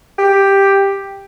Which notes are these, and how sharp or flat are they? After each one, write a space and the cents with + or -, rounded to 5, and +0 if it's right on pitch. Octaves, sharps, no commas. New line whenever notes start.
G4 +5